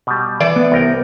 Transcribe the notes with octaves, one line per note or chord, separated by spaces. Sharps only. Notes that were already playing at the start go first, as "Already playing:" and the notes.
B2 G3
E3 D5
B3
C2 A#4 G5